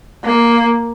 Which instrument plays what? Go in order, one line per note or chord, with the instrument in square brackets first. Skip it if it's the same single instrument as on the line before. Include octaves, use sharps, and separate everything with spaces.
[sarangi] A#3